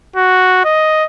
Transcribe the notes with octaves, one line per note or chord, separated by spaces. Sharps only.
F#4
D#5